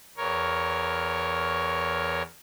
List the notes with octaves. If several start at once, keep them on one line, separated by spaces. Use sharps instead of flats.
E2 A#4 C#5